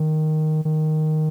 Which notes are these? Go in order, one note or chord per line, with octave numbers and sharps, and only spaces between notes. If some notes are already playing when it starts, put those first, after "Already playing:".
Already playing: D#3
D#3